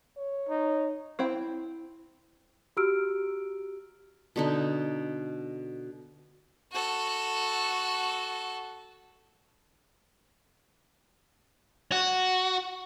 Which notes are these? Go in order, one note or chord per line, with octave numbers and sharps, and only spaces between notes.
C#5
D#4
C4 E4 G5
F#4 G4 A#5 E6 F6 D7
B2 D3 D#4
F#4 A4
F#4